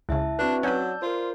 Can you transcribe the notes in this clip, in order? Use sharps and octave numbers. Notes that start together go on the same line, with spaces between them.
C#2 C#3 E4 E5 A5
C4 D4 F#4 B4
F#3 C#4 D#4 B4 D5 A5 E6 G6
F4 A#4 C5